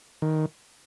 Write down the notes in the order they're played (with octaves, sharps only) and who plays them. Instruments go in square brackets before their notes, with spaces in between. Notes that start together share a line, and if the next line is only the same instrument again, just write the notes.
[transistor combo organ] D#3